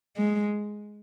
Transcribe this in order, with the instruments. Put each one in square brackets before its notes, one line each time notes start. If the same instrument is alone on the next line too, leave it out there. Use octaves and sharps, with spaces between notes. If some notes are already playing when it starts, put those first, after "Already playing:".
[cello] G#3